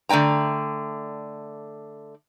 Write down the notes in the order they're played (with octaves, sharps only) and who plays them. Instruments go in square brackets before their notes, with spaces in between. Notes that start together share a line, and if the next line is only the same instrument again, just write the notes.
[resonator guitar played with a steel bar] D3 A3 D5 G5 A#5